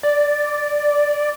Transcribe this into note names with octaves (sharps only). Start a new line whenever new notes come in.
D5